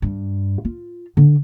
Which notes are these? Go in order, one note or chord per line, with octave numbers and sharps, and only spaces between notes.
G2
F4
D3